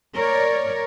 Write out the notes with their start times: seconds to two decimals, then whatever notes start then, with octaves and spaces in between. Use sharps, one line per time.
0.15 A#4 C#5 D5